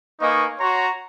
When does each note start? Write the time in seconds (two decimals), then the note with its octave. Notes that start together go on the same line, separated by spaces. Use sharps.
0.21 A#3 D#4 B4 D#5 G#5 C#6
0.60 F#4 C#5 A#5 C6 C#6